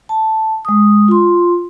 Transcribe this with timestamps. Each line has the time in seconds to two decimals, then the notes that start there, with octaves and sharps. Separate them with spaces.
0.09 A5
0.65 G#3 D#6
1.08 F4 C6